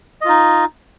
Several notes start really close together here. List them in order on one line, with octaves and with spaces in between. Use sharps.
D#5 F4 D#4